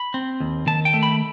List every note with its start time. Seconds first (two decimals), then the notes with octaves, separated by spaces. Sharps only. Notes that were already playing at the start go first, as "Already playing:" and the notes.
Already playing: B5
0.14 C4
0.40 D#2
0.67 D#3 A5
0.85 G5
0.94 A3
1.03 B5